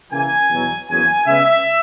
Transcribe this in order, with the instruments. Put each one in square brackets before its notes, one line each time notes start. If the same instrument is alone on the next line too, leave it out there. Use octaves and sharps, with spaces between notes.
[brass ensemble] C#3 E3 A#3 G#5
E2 B2 F#3
E2 C#3 F#3 A#3 G#5
C#3 G#3 B3 E5